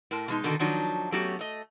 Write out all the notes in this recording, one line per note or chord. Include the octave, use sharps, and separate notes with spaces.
A2 A#4 A5
B2 G#3 D#4
B2 D3 D#3 D#4 F#4 A4
D#3 F3 F#3 D4 D#4
F#3 A3 B3 C#4 F#4 G4
A3 D#5